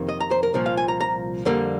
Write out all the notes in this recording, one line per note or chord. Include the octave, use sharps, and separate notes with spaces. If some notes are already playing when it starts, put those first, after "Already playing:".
Already playing: F2 C3 D#3 A#3
D#5
A#5
C5
A#4
C2 A#2 F3
F5
G#5
A#5
A#5
F2 D3 G3 A#3